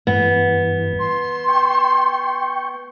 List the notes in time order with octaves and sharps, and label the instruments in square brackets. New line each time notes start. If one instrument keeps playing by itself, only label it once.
[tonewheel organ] G2 E3 [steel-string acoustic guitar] B3
[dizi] C6
[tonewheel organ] G5 C#6